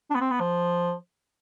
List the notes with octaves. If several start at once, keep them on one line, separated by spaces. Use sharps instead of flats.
D4
B3
C4
B3
F3